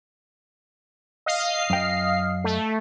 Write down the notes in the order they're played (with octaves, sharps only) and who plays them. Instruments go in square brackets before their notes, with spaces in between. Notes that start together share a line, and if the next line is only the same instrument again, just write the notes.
[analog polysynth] D#5 F5 C7
[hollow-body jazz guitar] F#2 G5
[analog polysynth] A3